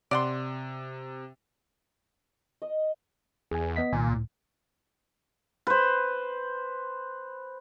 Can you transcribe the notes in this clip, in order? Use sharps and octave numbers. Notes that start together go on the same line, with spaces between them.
C3 D5 F#5 C6
D#5
E2 G#4 G#5
B3 D#5 B6
C2 A#2 D#3 G#5
C#2 A2
B4 C5